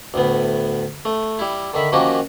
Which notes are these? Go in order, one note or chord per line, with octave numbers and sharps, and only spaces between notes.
D2 A2 B3
A3
G3 E4
D3 D#3 E5 B5
D#3 F3 A#3 C#4 F#4 G4